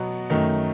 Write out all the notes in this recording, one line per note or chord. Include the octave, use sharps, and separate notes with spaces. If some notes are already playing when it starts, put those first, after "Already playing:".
Already playing: B2 F#3 B3 F#4
F#2 D#3 A3 D#4